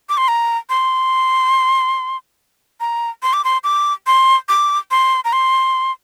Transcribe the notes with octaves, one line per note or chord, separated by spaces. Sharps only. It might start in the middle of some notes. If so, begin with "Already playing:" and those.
D6
C6
A#5
C6
A#5
C6
D6
C6
D6
C6
D6
C6
A#5
C6